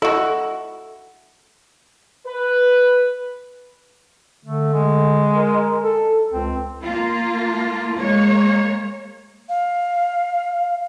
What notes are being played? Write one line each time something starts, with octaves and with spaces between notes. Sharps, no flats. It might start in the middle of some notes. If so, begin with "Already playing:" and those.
E4 F#4 A4 D#5
B4
D3 A3
G#3
A#4
A4
C#2 C4
A#3 F4
G#3 A#3 C#5
F5